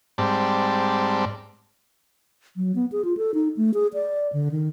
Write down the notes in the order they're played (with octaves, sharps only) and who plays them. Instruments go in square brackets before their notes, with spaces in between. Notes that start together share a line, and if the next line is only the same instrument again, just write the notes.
[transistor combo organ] G#2 G3 C4 D5 A5
[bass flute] F#3
B3
G#4
F4
A4
D#4
A3
G#4
D5
D3
D#3